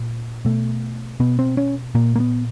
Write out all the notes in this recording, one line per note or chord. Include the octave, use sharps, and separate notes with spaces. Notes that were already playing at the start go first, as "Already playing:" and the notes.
Already playing: A#2
B2 A3
B2 B3
C4
C#4
A#2 A#3
A#3
B3